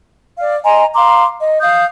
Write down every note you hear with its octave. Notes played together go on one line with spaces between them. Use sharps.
D5 F5
D#5 G#5 A#5 C6
F5 A#5 C6 D6
D#5
F5 D#6 G6